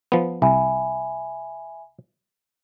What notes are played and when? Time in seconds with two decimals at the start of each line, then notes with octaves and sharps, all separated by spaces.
0.12 F3 B3
0.42 C2 E5 G#5 B5